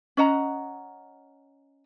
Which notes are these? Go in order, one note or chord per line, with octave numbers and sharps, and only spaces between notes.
C#4 D#5 F#5 A#5